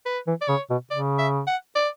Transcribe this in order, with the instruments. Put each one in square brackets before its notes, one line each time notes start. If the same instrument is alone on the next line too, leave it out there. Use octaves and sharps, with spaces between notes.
[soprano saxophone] B4
[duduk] E3
[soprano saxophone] D5
[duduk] C#3 [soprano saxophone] C#5
[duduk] B2
[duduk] C#3 [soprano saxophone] D5
[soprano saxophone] E5
F#5
D5